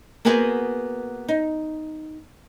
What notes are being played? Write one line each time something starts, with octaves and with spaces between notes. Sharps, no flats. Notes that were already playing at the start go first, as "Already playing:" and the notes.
A#3 B3 F#4 G#4 B4 C5
D#4